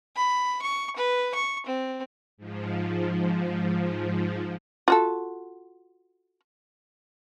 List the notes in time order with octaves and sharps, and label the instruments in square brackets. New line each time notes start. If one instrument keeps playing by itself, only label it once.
[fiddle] B5
C#6
B4
C#6
C4
[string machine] G#2 F3
[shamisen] F4 F#4 A4